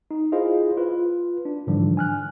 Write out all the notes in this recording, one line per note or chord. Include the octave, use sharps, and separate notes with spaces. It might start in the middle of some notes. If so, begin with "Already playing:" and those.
D#4
E4 F4 G#4 C5 D#5 F5
F4 B4
D4
G#2 D3 E3 F3 G3 D4
G#5 F6 F#6